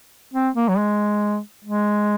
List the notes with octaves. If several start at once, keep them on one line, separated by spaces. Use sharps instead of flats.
C4
A#3
F#3
G#3
G#3